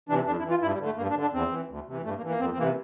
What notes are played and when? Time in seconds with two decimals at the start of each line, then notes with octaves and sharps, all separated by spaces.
0.09 C3 E3 D4
0.27 F2 D4
0.39 E4
0.44 E3
0.50 F4
0.62 G2 E4
0.74 G3
0.80 D3
0.86 A3
0.97 G2 A#3
1.10 D4
1.16 D3
1.22 D4
1.33 E2 C4
1.51 E3
1.70 D2
1.88 C3 E3
2.04 G2 A3
2.17 A#3
2.23 E3
2.29 A#3
2.40 F2 C4
2.52 C4
2.58 C3 E3 A#3